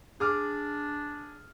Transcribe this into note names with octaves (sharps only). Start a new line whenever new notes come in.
D4 G#4 D6 F6